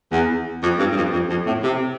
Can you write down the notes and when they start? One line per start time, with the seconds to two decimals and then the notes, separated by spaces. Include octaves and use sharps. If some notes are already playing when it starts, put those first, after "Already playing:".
0.12 E2
0.63 F2
0.79 G2
0.92 G2
0.96 F2
1.13 F2
1.30 F2
1.47 A2
1.63 C3